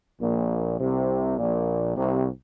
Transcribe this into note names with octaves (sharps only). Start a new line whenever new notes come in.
A#1 A#2
C2 C3
A#1 A#2
C2 C3